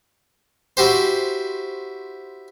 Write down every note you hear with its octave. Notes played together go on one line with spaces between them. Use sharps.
E4 F#4 G4 C5